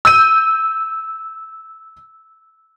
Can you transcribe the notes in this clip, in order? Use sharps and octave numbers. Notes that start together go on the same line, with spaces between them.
E6 G6 D#7